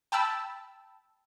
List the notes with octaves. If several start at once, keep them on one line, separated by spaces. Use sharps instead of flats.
G5 A5 B5 E6